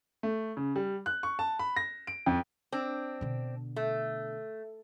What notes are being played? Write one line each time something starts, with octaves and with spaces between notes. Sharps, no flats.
A3
C#3
G3
F#6
C#6
A5
B5
A#6
D7
F2
C4 D4
B2 D3
A3